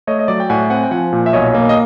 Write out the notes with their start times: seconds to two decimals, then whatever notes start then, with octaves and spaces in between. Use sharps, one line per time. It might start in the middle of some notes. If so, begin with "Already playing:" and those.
0.07 A3 C#5 D#5
0.19 D#5
0.28 F#3 D5
0.40 G5
0.50 A2 F#5 G#5
0.70 C4 F#5 G#5
0.83 G5
0.91 F3 F#5 G#5
1.13 A#2
1.26 E5
1.33 B1 C#5 D#5
1.54 A#3
1.69 D#5